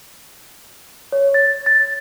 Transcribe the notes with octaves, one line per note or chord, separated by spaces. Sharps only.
C#5
A6
A6